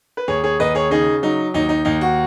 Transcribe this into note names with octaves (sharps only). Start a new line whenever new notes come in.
B4
D#2 G#4 C#5
G#4 C#5
D#2 B4 D#5
G#4 C#5
C#3 D#4 G#4
F#3 D#4
D#2 D#4
D#4
D#2 D#4
F#4